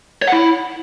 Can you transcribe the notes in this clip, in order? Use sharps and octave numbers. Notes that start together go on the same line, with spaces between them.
C#5
F#5
E4